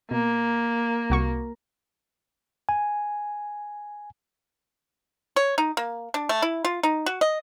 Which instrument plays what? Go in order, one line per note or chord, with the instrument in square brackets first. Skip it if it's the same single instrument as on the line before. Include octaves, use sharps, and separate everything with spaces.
[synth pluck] B2 [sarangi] A#3
[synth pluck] C2 F#4 C#6
[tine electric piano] G#5
[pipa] C#5
D#4
A#3
D4
A3
E4
F4
D#4
F#4
D#5